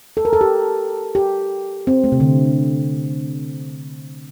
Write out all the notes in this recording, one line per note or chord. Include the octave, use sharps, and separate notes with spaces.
A4
A#4
A4
G4
G4
C4
A3
C3
D3